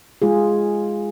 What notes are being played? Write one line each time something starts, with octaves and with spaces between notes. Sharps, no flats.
G#3 F4 G#4